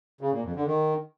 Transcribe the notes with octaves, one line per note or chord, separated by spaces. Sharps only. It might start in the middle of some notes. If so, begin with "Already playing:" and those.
C#3
A#2
F2
D3
D#3